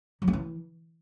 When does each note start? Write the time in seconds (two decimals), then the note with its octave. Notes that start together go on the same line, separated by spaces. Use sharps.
0.22 F#3
0.28 C#4
0.33 E3